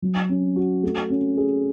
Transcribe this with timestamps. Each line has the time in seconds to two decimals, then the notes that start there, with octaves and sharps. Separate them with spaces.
0.02 F#3
0.29 C#4
0.56 F#4
0.83 A3
1.10 C#4
1.37 G#4